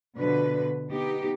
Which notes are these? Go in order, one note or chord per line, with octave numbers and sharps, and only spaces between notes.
B2 D3 F3 B4
B3 D#4 G4